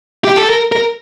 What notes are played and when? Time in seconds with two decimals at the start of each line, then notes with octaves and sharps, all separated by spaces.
0.24 G4
0.37 A4
0.49 A#4
0.72 A#4